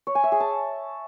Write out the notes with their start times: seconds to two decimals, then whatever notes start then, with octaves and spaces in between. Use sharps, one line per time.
0.07 C#5
0.15 G#5
0.24 E5
0.32 G#4
0.40 A5